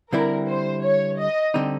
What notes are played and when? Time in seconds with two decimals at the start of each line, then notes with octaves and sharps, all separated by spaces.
0.12 D3 G3 C4 E4 A#4
0.48 C5
0.84 C#5
1.20 D#5
1.54 D3 G3 C4 D#4